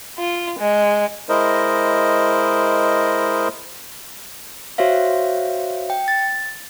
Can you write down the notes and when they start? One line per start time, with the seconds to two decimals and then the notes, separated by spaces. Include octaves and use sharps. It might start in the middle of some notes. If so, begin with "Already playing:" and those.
0.19 F4
0.59 G#3
1.29 G#3 E4 A#4 C5 D#5
4.78 F#4 C5 C#5 E5 F5
5.90 G5
6.08 A6